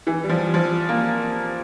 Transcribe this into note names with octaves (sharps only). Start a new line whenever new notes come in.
E3
G3
F3
F3
A#3